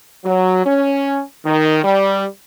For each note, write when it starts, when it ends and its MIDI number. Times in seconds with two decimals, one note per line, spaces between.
0.25 0.64 54
0.65 1.22 61
1.45 1.82 51
1.83 2.23 55